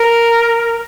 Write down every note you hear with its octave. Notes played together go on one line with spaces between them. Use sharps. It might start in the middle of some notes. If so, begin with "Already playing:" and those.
Already playing: A#4